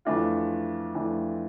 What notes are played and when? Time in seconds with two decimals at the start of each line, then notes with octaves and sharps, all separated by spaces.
0.05 F2 E3 A3 D4 F4
0.94 F2 E3 A3 D4 F4